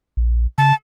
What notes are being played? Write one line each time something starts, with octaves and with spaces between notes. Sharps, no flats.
A#1
C#3 A5